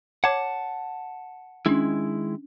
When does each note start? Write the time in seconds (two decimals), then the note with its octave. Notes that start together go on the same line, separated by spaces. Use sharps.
0.24 C#5 F#5 A5 D6 G#6
1.66 D#3 G#3 C#4 D4 E4